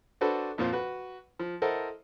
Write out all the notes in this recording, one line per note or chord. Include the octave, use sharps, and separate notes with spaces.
D4 F#4 A4 B4 C5
F2 A#2 F3 F4 C5 F5
F#4 B4
F3
E4 A4 A#4 C5 D#5 F#5